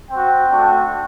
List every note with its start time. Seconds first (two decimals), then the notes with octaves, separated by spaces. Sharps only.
0.11 C4 F#4 G5
0.52 A3 D4 F#4